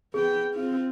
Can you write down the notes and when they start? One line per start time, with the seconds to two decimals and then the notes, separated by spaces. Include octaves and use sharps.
0.14 B3 G#4 G5
0.55 C4 F4